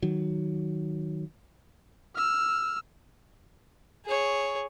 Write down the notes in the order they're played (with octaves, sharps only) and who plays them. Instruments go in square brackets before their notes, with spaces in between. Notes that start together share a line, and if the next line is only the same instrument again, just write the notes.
[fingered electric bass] D#3 F#3
[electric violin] E6 F6
[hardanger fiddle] G#4 C#5